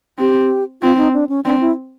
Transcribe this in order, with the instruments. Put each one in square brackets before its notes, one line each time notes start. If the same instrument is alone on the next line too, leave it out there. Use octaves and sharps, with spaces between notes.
[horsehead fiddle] C4 [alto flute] G4
[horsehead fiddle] C4 [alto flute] F4
[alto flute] D#4
D4
C#4
[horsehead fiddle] C4 [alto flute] D4
[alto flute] E4